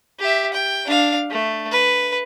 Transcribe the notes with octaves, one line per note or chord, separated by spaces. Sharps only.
G4 E5
G5
D4 F5
A3
B4